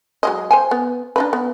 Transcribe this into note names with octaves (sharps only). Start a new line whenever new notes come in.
F#3 G#3 D#5
C5 G5 G#5
B3
D4 D#4 B4
B3